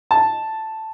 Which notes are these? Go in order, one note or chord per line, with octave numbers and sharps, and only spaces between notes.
A5